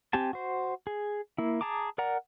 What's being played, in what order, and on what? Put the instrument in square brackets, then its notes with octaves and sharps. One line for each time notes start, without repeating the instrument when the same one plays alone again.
[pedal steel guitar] C4 G4 G#5 A5
F#4 C5
G#4
A#3 E4
G#4 A5 A#5 D6
A#4 D5 F#5 A#5